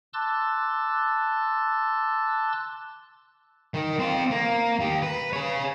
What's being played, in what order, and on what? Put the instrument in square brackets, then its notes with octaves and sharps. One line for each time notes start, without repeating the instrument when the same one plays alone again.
[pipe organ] A5 C6 D6 E6 F#6 A6
[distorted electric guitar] D#3
C4 F4
A#3
D#2 G4
B4
G#4 C#5